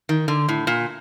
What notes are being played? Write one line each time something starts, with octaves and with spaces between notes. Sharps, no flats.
D#3
D3
A2
A#2